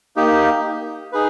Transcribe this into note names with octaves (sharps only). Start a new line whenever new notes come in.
A#3 D#4 G4
D#4 G#4 B4